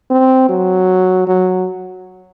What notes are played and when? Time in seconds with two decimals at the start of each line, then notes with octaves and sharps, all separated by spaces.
0.10 C4
0.49 F#3
1.27 F#3